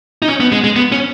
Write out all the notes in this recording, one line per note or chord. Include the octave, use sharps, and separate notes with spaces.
D#4
C#4
B3
G#3
G#3
B3
C#4